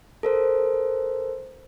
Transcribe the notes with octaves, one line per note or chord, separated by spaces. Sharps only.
A4 A#4 C5